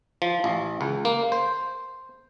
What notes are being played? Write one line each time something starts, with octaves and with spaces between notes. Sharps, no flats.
F3
A1
C#2
A#3
C5